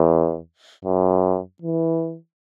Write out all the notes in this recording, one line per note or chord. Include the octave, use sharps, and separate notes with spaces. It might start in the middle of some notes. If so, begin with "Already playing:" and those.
Already playing: E2
F#2
E3